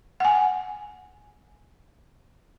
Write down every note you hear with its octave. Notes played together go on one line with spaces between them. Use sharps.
F#5 G#5